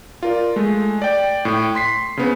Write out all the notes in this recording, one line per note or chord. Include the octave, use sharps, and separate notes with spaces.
F4 A#4 D5
G#3 A3
D5 G5
A2 G5
C6 B6 C7
C#3 B3 C4